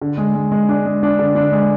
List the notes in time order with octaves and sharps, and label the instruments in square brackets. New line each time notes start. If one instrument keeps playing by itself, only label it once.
[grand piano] D3
G#3
G#3
G#3
D4
G#3
D4
D3
D4
G#3